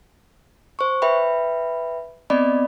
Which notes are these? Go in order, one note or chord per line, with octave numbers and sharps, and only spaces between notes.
C5 C#6
B4 E5 G5 B5
B3 C4 D5 D#5 B5